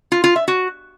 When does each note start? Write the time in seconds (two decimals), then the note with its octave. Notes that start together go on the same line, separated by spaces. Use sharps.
0.12 F4
0.24 F4
0.36 E5
0.48 F#4